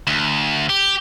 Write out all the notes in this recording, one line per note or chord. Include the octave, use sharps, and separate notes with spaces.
D2
G4